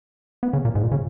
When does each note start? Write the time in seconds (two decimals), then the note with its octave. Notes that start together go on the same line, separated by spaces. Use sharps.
0.43 B3
0.53 C#3
0.65 A#2
0.75 G#2
0.83 A#2
0.92 C#3